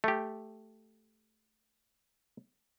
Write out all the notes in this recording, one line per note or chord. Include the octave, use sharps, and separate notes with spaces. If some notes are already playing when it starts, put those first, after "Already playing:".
A3 G4